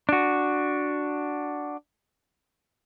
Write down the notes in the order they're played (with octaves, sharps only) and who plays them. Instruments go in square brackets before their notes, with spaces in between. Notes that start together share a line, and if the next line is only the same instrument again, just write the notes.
[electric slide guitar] D4 F#4